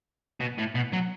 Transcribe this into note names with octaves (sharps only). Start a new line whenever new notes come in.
B2
A2
B2
F#3